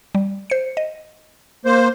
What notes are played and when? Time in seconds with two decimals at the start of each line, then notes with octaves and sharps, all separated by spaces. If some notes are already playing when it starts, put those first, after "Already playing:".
0.15 G3
0.50 C5 C#7
0.77 D#5
1.65 A#3 C5